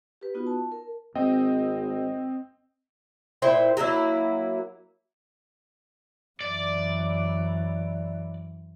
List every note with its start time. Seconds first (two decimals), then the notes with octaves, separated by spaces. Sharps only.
0.21 G4 B4
0.34 B3 D#4 F4 F#4
0.47 A5
0.72 A#4
1.15 G#1 C4 D#5 G5
3.42 A#2 E4 C5 G5
3.77 F#3 A#3 D#4 E4
6.41 F#2 E3 D5